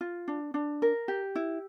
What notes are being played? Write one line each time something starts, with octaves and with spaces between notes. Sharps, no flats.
F4
D4
D4
A#4
G4
E4